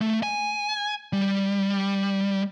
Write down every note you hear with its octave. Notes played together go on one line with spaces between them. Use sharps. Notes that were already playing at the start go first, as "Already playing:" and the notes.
A3
G#5
G3